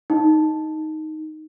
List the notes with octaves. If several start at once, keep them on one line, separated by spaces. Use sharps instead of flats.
D#4